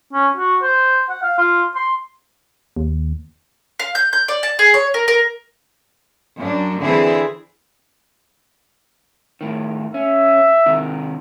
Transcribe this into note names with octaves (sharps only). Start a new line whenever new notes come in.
C#4
F#4
C5
F#5
F5
F4
C6
D#2
F5
G6
G6
D5
A5
G#4
C#5
A#4
A#4
F#2 F#3 D4
D3 E3 C4 E4 G#4
A2 D#3
C#4 E5
C3 D#3